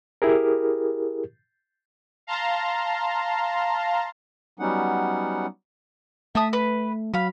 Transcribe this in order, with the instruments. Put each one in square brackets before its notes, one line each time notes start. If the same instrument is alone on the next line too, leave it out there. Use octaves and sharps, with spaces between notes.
[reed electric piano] E4 G4 G#4 A#4
[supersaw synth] F5 A5 A#5 C6
[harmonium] F#3 G3 B3 C#4 D#4 F#5
[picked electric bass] A3 [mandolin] E5 A5 D#6
[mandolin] B4
[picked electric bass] F#3 [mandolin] F5 B5